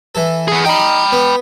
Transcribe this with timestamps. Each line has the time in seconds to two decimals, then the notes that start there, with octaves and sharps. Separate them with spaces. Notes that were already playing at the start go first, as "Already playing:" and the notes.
0.15 E3 A4
0.48 B3 G#4
0.66 D#4 G5 B5
1.12 B3